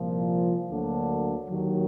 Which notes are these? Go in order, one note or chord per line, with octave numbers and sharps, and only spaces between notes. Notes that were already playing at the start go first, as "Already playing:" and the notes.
Already playing: C2 A#2 F3
D2 D3 F#3 A#3 D4
D#2 D#3 F#3